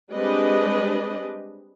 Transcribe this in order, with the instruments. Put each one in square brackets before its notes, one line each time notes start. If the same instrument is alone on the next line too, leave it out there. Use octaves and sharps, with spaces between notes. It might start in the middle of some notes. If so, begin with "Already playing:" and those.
[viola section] G3 G#3 C4 D4 B4 D#5